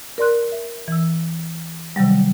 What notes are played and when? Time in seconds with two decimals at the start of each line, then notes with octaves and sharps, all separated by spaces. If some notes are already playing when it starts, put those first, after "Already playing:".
0.18 A#4 D5 C6 F#6
0.52 E5
0.88 E3 E6
1.96 C3 D#3 F#3 G3